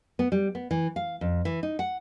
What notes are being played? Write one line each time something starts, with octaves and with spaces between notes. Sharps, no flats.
B3
G3
B3
E3
F5
F2
E3
D#4
F#5